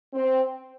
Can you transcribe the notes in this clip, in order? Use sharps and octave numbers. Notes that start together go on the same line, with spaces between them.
C4